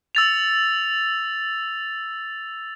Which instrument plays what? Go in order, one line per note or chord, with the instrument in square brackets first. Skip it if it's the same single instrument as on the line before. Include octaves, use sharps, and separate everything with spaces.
[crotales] E6 A6 F7